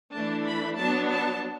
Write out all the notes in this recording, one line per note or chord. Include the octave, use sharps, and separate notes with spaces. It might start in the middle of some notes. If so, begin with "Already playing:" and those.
E3 A3 D4 A5
B5
F#3 B3 D4 A5
A5